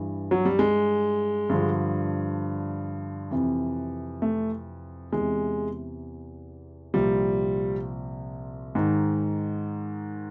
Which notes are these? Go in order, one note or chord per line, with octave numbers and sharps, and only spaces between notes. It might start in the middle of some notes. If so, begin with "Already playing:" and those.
Already playing: G2 E3
F#3
G3
G#3
G2 D3 F3
F2 C3 E3
A3
E2 C3 E3 G#3
C2 A#2 F3 G3
G#2 D#3